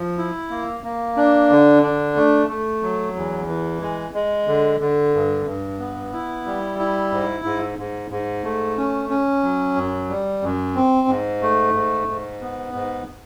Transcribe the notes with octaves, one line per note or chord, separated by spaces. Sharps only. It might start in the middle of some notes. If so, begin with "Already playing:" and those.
Already playing: F3
E4
A#3
A#3
D4
D3
D4
A3
A3
F#3
E2
E3
G#3
G#3
D3
D3
G2
G2
B3
E4
G3
E4
G#2
G#2
G#2
G#2
A3
C#4
C#4
F#3
F#2
G3
F#2
C4
G#2
A3
G#2
G#2
B3
G#2